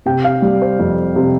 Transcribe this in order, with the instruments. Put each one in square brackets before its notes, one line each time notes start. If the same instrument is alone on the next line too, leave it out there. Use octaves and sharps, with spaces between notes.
[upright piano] C3 G5
F5
G3
C5
F2
C3